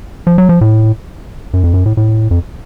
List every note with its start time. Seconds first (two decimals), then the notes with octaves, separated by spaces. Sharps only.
0.27 F3
0.38 F#3
0.49 F3
0.61 A2
1.53 F#2
1.63 F2
1.74 F#2
1.86 A2
1.97 A2
2.31 F2